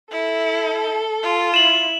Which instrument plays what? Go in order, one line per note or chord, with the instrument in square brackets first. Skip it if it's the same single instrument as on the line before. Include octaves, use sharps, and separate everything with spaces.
[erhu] E4 [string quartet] A4
[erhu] F4
[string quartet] E4 [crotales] E7 F#7